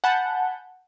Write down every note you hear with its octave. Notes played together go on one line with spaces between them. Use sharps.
F#5 G#5 A5 B5 G6